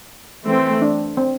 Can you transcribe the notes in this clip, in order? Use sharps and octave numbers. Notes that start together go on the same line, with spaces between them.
E3 A3 C4
D4
C4